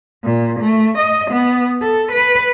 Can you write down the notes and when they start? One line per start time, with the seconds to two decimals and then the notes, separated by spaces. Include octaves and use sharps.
0.24 A#2
0.61 A3
0.98 D#5
1.31 B3
1.82 A4
2.12 B4